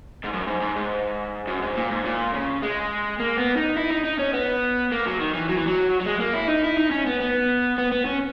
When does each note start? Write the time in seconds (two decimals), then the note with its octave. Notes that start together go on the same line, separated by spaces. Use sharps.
0.24 G#2
0.33 F#2
0.47 G#2
0.61 G#2
0.76 G#2
1.47 F#2
1.62 G#2
1.76 A#2
1.91 G#2
2.04 A#2
2.34 C#3
2.62 G#3
3.20 A#3
3.38 B3
3.57 D#4
3.76 E4
3.90 D#4
4.05 D#4
4.19 C#4
4.33 B3
4.92 A#3
5.06 F#3
5.20 D#3
5.34 E3
5.49 F#3
5.58 E3
5.67 F#3
6.01 F#3
6.06 G#3
6.20 A#3
6.34 E4
6.48 D#4
6.64 E4
6.77 D#4
6.91 C#4
7.06 B3
7.20 B3
7.78 B3
7.92 B3
8.05 C#4